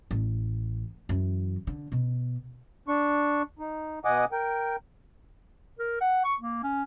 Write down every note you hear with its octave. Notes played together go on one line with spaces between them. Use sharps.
A1
F#2 E3
D3
B2
D4 C#6
D#4
B2 D#5 F#5 G#5 D6 D#6
A#4 G5
A#4
F#5
C#6
A#3
C#4